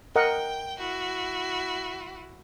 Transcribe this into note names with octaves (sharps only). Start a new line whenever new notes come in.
A#4 D#5 F#5 G5
E4 F#4